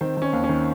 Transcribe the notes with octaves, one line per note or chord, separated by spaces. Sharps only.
D#3 C4
D#3 C#4
D#2
C#4
D#3